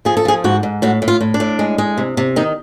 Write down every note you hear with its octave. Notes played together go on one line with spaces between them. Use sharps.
F3 G#4
A4
F3 G#4
G#2 F#4
G#2
A2 F#4
A2
F4
A2
D4
A2
G#3
G#3
C3
C3
D#3 D#4